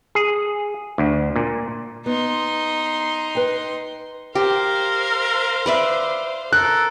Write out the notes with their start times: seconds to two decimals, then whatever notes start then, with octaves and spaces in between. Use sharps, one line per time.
0.15 G#4
0.98 D2
1.36 A#2
2.06 B3 D#4 C6
3.35 B4 G5
4.35 G4 A#4 C5 F5
5.66 B4 D5 E5
6.53 A4 A#4 F#6